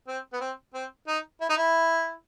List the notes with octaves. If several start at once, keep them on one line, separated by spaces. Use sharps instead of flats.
C4
B3
C4
C4
D#4
E4
D#4
E4